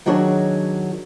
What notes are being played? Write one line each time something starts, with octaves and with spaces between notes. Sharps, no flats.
D#3 F#3 D4 F#4 G#4 C#5